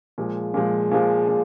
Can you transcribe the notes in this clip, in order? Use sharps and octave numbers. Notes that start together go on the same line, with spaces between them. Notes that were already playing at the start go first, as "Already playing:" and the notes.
A#2 F3 G#3
A#2 F3 G#3
A#2 F3 G#3
A#2